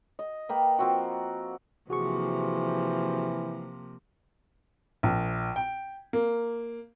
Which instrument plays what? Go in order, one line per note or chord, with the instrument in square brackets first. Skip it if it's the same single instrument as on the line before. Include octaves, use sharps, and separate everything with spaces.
[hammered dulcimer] D#5
A#3 B4 G5
F3 C4 F#4
[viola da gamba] C3 F3 A#3 [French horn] E3 [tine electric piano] F#4 G#4 C#6
[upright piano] A#1
G5
A#3